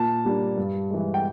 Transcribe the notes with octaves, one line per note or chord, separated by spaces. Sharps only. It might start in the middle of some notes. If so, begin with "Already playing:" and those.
Already playing: A#2 A5
G3 A#3 D4
G2
E3 G#3
G5